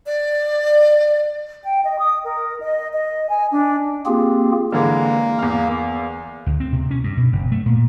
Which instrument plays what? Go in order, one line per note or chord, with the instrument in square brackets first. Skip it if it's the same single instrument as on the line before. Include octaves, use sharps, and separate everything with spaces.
[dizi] D5
[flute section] G5
D#5
D#6
A#4
D#5
D#5
G#5
D4
[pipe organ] A#3 C4 F4 G4 G#4
[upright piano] D3 E3 G#3 [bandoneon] A#3
[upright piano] E2 F5
[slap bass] D2
C4
C3
C#4
G2
B2
F#1
A3
A#2